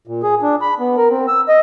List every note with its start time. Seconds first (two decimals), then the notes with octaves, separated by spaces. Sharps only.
0.07 A#2
0.23 G#4
0.42 D4
0.61 B5
0.80 B3
0.97 A#4
1.10 C4
1.28 E6
1.48 D#5